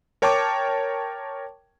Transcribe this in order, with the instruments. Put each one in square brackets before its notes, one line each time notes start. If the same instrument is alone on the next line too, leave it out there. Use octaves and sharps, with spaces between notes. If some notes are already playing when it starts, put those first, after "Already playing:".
[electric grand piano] A#4 C#5 G5 A5 C#6 D6